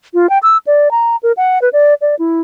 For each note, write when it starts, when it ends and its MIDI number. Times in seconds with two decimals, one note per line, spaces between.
0.14 0.29 65
0.29 0.38 79
0.43 0.57 88
0.67 0.91 74
0.91 1.16 82
1.23 1.32 70
1.37 1.59 78
1.62 1.69 71
1.73 1.94 74
2.01 2.15 74
2.19 2.41 64